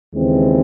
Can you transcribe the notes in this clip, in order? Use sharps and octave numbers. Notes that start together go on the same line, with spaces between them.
D#2 C#3 E3 G#3 C4